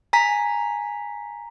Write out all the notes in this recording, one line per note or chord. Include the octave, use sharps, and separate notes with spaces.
G#5 A#5 B6